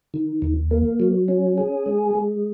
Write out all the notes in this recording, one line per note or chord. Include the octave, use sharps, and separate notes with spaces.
D#3
D#2
A#3
F#3
C#4
G#4
G#3
G#3